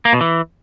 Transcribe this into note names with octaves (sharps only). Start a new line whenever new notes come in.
A#3
B2
E3